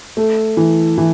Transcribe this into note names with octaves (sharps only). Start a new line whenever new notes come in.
A3
E3
E3